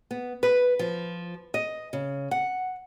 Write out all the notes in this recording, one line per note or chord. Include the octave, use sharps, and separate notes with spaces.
B3
B4
F3
D#5
C#3
F#5